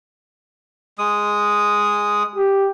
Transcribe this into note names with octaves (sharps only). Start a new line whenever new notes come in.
G#3 D#6
G4